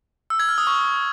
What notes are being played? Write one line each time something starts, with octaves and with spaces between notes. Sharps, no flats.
E6
G#6
F6
D#6
C#6